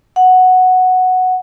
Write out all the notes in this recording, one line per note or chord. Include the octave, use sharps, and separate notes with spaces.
F#5